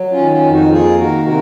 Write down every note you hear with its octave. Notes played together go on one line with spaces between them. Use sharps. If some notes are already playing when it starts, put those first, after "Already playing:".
Already playing: F#3
C#4 F4
D#3
C#4 F4
F2
D#4 F#4
A#3 F4 G#4
D#3 F#4 A#4
C3 F#4 A#4